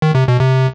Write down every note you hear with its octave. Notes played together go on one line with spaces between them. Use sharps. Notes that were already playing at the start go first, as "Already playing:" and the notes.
D#3
C3
B2
C3